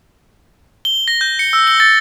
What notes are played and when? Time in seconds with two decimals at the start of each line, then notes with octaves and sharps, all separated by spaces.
0.85 G7
1.08 A#6
1.21 G6
1.39 C#7
1.53 E6
1.67 G7
1.80 A6